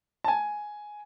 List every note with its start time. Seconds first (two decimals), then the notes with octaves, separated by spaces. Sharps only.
0.24 A5
0.28 G#5